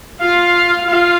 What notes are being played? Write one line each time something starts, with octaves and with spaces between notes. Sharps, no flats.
F4 F5
F4 F5